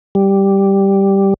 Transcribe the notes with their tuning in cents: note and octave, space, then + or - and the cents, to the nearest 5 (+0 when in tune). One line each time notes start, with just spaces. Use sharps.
G3 +0